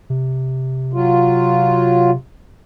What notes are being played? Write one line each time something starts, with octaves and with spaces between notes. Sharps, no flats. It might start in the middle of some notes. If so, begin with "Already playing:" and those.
C3
F#3 F4